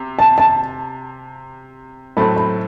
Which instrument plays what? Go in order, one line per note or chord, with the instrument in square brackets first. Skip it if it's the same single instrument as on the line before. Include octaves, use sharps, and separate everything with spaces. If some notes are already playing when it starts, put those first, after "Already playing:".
Already playing: [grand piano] C3
[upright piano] A5
A5
[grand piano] A2 F#3 A3 C4 [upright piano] B5
[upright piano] B5